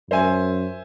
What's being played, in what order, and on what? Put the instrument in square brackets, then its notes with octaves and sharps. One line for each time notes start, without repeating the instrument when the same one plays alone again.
[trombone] F#2 [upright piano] C5 E5 G#5